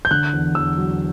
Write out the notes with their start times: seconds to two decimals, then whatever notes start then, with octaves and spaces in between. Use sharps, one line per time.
0.05 G6
0.11 D3 F#6
0.33 E2
0.55 E2 E6
0.77 F#3